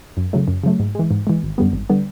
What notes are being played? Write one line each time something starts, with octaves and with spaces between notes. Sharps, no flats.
F#2
C#3 F#3 A3
F#2
C#3 F#3 A3
G#2
E3 G#3
G#2
E3 G#3
G#1
F#2 D3 G3 B3
G#1
D3 G3 B3